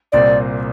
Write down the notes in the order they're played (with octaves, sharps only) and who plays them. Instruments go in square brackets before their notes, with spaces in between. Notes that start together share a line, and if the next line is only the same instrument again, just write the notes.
[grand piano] C2 A#2 G3 C4 [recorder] D5